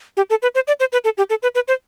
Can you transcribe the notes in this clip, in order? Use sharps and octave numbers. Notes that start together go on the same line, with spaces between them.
G4
A4
B4
C5
D5
C5
B4
A4
G4
A4
B4
B4
C5